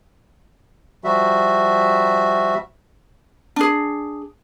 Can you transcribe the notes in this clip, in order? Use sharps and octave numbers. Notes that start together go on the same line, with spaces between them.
F3 G3 F#4 E5
D4 G#4